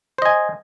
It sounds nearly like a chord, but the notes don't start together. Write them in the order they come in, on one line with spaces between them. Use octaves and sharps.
C5 D#5 G#5